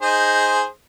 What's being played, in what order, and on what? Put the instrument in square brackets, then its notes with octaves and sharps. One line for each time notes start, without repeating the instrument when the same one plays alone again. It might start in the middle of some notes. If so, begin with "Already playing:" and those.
[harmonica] D#4 G#4 C5